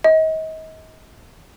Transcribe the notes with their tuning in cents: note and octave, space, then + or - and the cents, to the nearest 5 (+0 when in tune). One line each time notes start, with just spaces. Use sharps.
D#5 +35